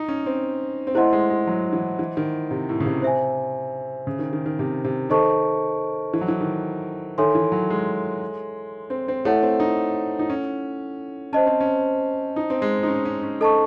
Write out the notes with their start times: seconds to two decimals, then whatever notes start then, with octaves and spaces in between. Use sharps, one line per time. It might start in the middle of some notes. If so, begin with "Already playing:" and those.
Already playing: D#4
0.08 C#4
0.26 C4
0.87 C4
0.95 A3 E4 C5 D#5 F#5 C6
1.13 G#3
1.30 G#3
1.47 F#3
1.73 E3
1.99 E3
2.17 D#3
2.51 C3
2.69 A2
2.80 C#3
2.86 C3
3.02 C5 E5 G#5
4.07 C#3
4.19 D#3
4.33 D#3
4.46 D#3
4.59 C3
4.84 C3
5.10 D#3 A4 C5 D#5 A5 C#6
6.14 E3
6.21 F#3
6.28 E3
6.41 D#3
7.18 D#3 A4 C#5 E5 G#5 C6
7.35 E3
7.52 F#3
7.70 G#3
8.90 C4
9.08 C4
9.25 A3 E4 A4 C#5 F#5
9.42 C4
9.60 D#4
10.19 D#4
10.30 C#4
11.33 C#4 C5 D#5 A5
11.46 C4
11.60 C#4
12.36 D#4
12.50 C4
12.62 G#3
12.83 D#4
12.88 C#4
13.05 C#4
13.23 C#4
13.41 A4 D#5 A5 C#6